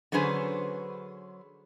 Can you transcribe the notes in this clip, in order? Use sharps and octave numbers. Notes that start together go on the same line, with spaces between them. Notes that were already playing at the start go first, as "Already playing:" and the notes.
D3 F#3 C#4 G#4 B4 C5